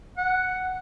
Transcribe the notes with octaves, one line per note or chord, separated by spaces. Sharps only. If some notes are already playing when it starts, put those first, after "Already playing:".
F#5